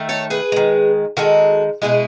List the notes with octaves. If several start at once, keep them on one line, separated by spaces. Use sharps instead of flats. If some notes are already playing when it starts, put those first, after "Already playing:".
Already playing: D#3 A3
A4 C#5
G#4 B4
D#3 G#3
D#3 G#3 F#4 A4
B2 G#3 E4 G#4